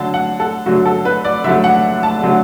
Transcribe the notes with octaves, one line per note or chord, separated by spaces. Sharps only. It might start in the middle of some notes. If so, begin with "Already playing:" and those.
Already playing: D3 F#3 A3 A5
F#5
A4
D3 F#3 A3 F#4
A4
B4
D5
D3 F#3 A3 E5
F#5
A5
D3 F#3 A3